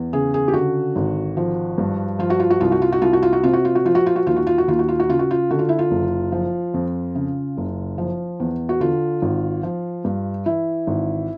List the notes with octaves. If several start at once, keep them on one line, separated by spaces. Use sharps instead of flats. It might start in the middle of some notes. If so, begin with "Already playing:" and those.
Already playing: E2
C#3 G#4
G#4
G4
D3 F#4
G#1
F3
G2
F3 F4
F#4
F4
F#4
C2 F4
F#4
F4
F#4
C2 F4
F#4
F4
F#4
C3 F4
F#4
F4
F#4
F3 F4
F#4
F4
F#4
D#2 F4
F#4
F4
F#4
D#2 F4
F#4
F4
F#4
C#3 F4
F#4
F4
D3 F#4
F4
E4
F4
F#1
F3
F2
C#3
F#1
F3
E2
F#4
D3 F4
G#1
F3
G2
E3 E4
G#1